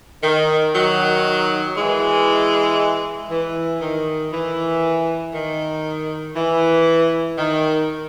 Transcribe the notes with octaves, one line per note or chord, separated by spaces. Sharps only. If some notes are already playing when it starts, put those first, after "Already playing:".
D#3
D#3 F#3
E3 G#3
E3
D#3
E3
D#3
E3
D#3